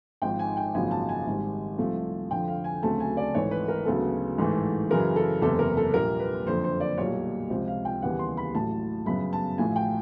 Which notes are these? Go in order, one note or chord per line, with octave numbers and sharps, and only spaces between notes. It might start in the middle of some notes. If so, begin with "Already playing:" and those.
G#1 G#2 F3 G5
G#5
G5
G#1 F#2 C#3 F3 A#3 G#5
A5
G#5
G#1 G#2 D#3 G3
C2 C3 F3 A3 C4
F2 D3 F3 G5
F5
G#5
D2 C#3 F#3 A3 C4 A5
G#5
D5
G#1 G#2 E3 A3 C#5
B4
A#4
D2 C#3 F#3 B3 A4
A1 G#2 E3 A3
F#2 C#3 E3 G#3 A#4
A4
F#1 E2 C3 A4
A#4
A4
A#1 A#2 G3 A#4
B4
F#1 F2 D3 C5
C5
D5
B1 A#2 G3 A#3 C#5
C#2 C3 F3 C5
F5
G5
D#2 C#3 E3 G3 B3 F#5
C6
B5
A1 A2 F#3 A5
G1 F#2 C#3 F#3 B3 B5
A5
A1 A2 F3 A3 G#5
G5